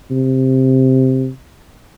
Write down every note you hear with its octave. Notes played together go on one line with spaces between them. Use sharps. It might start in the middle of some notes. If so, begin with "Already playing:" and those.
C3